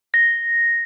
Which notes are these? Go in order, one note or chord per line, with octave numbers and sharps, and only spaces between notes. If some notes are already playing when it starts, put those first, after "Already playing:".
A#6